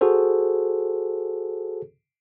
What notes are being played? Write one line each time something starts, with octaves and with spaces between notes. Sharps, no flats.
F#4 G#4 A4 C5